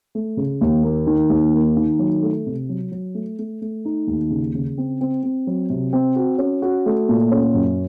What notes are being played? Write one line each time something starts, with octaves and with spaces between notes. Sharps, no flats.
A3
C#3
D#2
A#3
D#3
D#2
A#3
D#3
F#3
A3
C3
F#3
F#3
A3
A3
A3
D#4
D#2
C#3
C#3
C4
C4
C4
F#3
C3
C4
F#4
C#4
F#4
A3
A#2
C#4
F#2